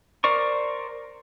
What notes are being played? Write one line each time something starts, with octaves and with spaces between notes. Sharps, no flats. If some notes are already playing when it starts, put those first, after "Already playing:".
A#4 C5 D5 C#6